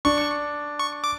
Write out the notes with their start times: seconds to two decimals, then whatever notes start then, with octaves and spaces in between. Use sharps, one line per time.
0.05 D4 C#6
0.79 C#6
1.04 D6